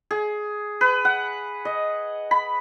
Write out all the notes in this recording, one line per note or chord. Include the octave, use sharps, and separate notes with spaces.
G#4
B4
F#5
D#5
B5